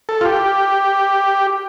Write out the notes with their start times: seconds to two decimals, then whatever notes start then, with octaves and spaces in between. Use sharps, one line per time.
0.09 A4
0.21 F4
0.25 G4